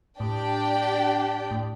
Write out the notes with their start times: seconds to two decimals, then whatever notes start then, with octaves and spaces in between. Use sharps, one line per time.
0.20 A2 D4 G4 D5 G5
1.51 A2